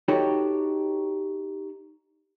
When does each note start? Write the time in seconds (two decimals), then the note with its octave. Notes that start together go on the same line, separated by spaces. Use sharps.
0.08 D#4 F#4 G4 A4 C#5